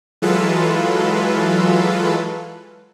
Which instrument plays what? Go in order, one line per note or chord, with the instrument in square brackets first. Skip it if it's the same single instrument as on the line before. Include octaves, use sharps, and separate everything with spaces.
[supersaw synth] E3 F#3 G#3 F4 A4 B4